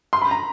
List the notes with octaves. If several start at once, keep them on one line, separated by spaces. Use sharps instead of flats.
C6
B5
A#5